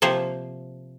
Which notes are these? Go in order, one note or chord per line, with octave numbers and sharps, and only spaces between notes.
C3 F3 A#3 C5